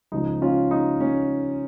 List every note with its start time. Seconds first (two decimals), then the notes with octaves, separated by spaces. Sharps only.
0.12 C#2 C#3 F3 D#4
0.42 C#4 F4
0.71 D#4
1.00 C#4